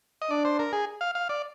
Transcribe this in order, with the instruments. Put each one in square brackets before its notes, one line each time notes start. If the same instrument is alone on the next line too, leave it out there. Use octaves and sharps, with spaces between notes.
[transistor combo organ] D#5
[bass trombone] D4 [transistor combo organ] D5
[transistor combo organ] C5
A#4
G#4
F5
F5
D5